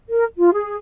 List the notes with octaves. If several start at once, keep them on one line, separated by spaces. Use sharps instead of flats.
A#4
F4
G#4